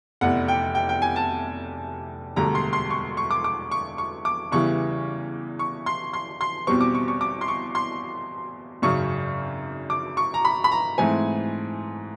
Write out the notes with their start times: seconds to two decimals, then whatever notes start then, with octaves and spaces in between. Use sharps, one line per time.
0.21 F1 E2 C3 F#5
0.48 G5
0.75 G5
0.89 G5
1.02 G#5
1.16 A5
2.36 E1 D2 D3 G3 A#5
2.55 C6
2.73 C6
2.90 C#6
3.17 C#6
3.31 D6
3.44 D6
3.71 C#6
3.98 C#6
4.25 D6
4.52 E2 C#3 E3 G3 C#6
5.59 C#6
5.86 C6
6.13 C6
6.41 C6
6.67 E2 B2 G3 C4 C#6
6.81 D6
6.95 C#6
7.08 C#6
7.21 D6
7.41 C6
7.48 C#6
7.75 C6
8.82 G#1 F#2 C#3 C#6
9.90 D6
10.17 C#6
10.34 A#5
10.45 B5
10.64 B5
10.72 A#5
10.98 G#2 E3 A3 C4 G#5